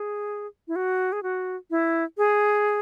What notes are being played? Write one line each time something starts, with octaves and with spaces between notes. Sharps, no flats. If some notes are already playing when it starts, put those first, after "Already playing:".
Already playing: G#4
E4
F#4
G#4
F#4
E4
G#4